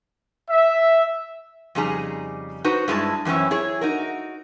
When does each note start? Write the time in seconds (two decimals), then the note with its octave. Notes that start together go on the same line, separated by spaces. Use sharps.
0.50 E5
1.75 F2 C#3 G3 D#4 G#4 A#5
2.64 D#4 F#4 B4 C5
2.88 G2 G#3 E4 G4 A5
3.25 F#2 E3 C4 C#4 E4
3.51 E4 G#4 C#5
3.81 D#4 F#4 A#4